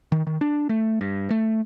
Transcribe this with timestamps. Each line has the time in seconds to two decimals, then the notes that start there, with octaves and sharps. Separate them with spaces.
0.12 D#3
0.27 D#3
0.41 D4
0.69 A3
1.01 G2
1.30 A3